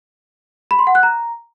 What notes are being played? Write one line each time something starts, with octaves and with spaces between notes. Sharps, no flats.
B5
C6
F#5
F#6
A#5